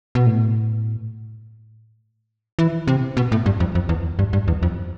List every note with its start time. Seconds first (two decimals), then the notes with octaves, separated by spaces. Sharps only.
0.15 B2
0.26 A2
2.59 E3
2.87 C3
3.17 B2
3.32 A2
3.46 G2
3.60 F2
3.75 F2
3.89 E2
4.19 G2
4.33 G2
4.48 E2
4.63 F2